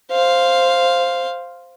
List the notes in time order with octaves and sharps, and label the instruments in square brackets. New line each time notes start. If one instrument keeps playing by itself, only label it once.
[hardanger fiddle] C5 F5